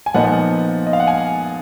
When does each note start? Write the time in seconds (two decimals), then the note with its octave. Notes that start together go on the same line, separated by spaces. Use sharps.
0.06 G#5
0.14 A#2 F3 B3 D#4 F#5
0.86 D#5
0.93 F5
1.00 F#5
1.08 G#5